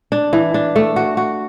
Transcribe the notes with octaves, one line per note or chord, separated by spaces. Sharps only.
D4
E3
D4
A3
F#4
F#4